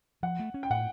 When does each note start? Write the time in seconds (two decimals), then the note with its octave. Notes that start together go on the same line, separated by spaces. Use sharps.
0.23 F3 F#5
0.39 A3
0.54 C#4
0.63 G5
0.70 A2 F#5